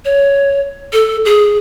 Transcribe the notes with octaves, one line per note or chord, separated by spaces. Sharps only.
C#5
A4
G#4